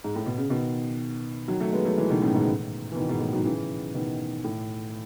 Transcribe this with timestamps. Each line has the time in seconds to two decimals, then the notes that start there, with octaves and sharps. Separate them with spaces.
0.04 G#2
0.16 A2
0.26 B2
0.38 C#3
0.49 B2 D#3
1.48 D#3 F#3
1.60 F#3 A3
1.72 G#3 B3
1.85 F#3 A3
1.97 E3 G#3
2.09 B2 D#3
2.22 A2 C#3
2.34 G#2 B2
2.92 E3
2.96 B2 D#3
3.08 G#2 B2
3.21 A2
3.33 D#3 F#3
3.45 C#3 E3
3.94 B2 D#3
4.44 A2